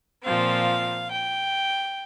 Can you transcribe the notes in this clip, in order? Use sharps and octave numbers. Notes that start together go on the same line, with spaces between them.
A#2 F3 C4 F5
G5